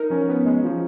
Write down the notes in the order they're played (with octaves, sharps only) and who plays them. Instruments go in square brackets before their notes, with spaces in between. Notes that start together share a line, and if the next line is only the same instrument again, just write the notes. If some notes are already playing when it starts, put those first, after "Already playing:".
Already playing: [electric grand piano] D#4 [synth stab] A#4
[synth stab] F3 [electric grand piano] C#4
[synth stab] B3
G#3
F3